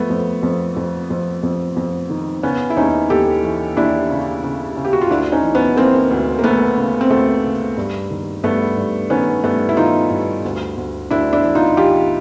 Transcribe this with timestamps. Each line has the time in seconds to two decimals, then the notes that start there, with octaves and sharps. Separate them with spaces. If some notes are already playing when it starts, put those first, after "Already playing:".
Already playing: F2 A3 B3
0.10 F2
0.43 F2
0.77 F2
1.10 F2
1.43 F2
1.77 F2
2.10 D#3
2.43 C#3 B3 C#4
2.70 E4
2.77 D#2 C#4 D#4
3.10 D#2 G4 A4
3.43 E3
3.77 D#2 D4 E4
4.10 C#3
4.44 C#3
4.77 C#3
4.85 G4
4.93 F#4
5.01 F4
5.10 D2 D4 E4
5.32 C#4 D#4
5.43 E3
5.55 B3 C#4
5.76 E3 A#3 C4
6.11 D2
6.39 A#3
6.44 D2 A3 B3
6.77 C#3
7.01 C4
7.10 D2 A3 B3
7.44 C#3
7.77 G2
8.10 D#3
8.44 G2 A3 B3
8.77 G2
9.10 D#3 B3 C#4
9.44 G2 A3 B3
9.69 E4
9.77 D#3 D#4 F4
10.10 G2
10.44 D2
10.77 D2
11.10 D2 D4 E4
11.33 D4 E4
11.44 E3
11.55 D#4 F4
11.77 E3 F4 G4